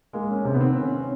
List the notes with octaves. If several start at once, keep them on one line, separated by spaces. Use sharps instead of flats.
G#3 A#3
C#4
C3
B3
D#3 C4
C#4
C#4